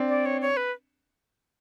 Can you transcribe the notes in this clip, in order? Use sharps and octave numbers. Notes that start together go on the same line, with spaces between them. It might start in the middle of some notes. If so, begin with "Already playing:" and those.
Already playing: C4 D4
D5
C#5
C#5
B4